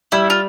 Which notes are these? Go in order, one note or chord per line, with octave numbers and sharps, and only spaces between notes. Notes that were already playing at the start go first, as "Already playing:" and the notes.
G3 E4
F4